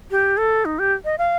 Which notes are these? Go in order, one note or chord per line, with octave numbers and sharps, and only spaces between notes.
G4
A4
D#4
G4
D#5
F5